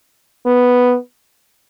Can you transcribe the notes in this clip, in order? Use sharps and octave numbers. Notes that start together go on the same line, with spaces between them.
B3